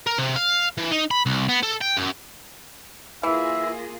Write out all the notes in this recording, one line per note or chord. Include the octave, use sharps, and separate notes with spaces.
A#4
C3
F5
E3
D#4
B5
C2
B3
A4
G5
F#2
E3 A#3 F4 G#4 E5